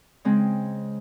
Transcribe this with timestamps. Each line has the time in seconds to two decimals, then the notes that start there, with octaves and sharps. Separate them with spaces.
0.25 C#3 G#3 C4